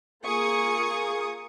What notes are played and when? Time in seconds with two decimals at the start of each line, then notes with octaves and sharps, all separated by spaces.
0.24 A#3 F4 G#4 C#6 D#6